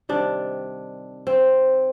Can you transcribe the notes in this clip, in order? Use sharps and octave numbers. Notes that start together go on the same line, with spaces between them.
C3 D#3 G3 D4
C4